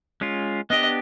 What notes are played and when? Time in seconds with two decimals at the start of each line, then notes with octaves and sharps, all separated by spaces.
0.21 G#3 C#4 F4
0.70 B3 D4 G4 D#5